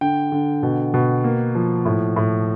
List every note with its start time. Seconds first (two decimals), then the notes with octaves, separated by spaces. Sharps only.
0.01 D3 G5
0.32 D3
0.63 B2
0.94 B2
1.24 A#3
1.55 F3
1.85 A2
2.16 A2